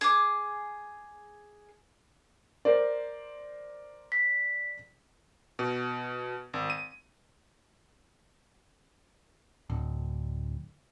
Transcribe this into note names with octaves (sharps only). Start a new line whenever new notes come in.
G#4 D6
A#4 C5 D5
B6
B2
G#1
D#7
D1